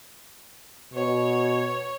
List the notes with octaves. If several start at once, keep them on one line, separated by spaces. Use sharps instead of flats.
B2 C#5